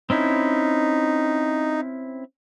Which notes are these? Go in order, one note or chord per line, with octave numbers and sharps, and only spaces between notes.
C4 C#4 D#4 E4